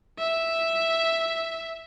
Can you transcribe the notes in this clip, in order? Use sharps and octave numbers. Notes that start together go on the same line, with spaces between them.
E5